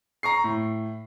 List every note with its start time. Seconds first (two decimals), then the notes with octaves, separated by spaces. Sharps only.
0.23 A#5 C#6 C7
0.44 A2